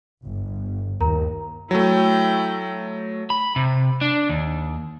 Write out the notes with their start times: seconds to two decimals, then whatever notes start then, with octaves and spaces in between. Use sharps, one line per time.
0.24 G1
1.00 D#2 A#4 A#5
1.71 F#3 A3 E4 G5
3.30 B5
3.56 C3
4.01 D4
4.29 D#2